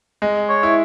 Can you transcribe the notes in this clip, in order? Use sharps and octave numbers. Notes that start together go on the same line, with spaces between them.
G#3
C#5
E4